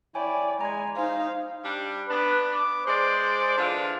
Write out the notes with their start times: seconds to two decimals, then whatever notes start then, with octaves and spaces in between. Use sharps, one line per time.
0.15 E4 C#5 D5 G5 G#5
0.61 G#3 G#5 A#5 G#6
0.97 D#4 C5 F5
1.63 G3 D4
2.09 B3 D4 B4
2.54 D6
2.86 G#3 C5 D5
3.57 D3 E3 F4